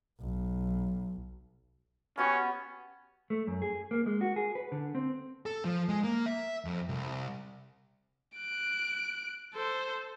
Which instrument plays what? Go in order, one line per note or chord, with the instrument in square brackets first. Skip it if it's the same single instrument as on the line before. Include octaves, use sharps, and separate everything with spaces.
[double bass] B1
[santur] B3 F#4 G4 [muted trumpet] C#4
[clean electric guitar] A3
F#2
G#4
A#3
G#3
F#4
G#4
B4
D3
C4
[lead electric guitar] A4
F3
G#3
A#3
E5
F2
C2
[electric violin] F#6 D7
A4 C5